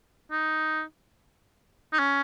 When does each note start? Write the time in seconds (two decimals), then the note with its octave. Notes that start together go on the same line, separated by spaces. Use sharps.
0.32 D#4
1.93 D#4
1.99 C#4